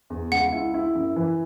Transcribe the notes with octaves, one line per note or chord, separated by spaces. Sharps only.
E2
C#2 F#5
E4
E4
F#2
E3